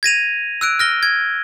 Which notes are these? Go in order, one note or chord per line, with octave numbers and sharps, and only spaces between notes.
G#6 A#6 D#7 F7
E6 F#6 D7
F6 A#6 G7
G#6